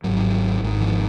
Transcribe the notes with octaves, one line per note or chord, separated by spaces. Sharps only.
G#1 G#2 F#3
G#1 G#2
F3